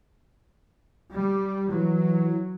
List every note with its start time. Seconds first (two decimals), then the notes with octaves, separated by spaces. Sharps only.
1.11 G3
1.69 E3 F#3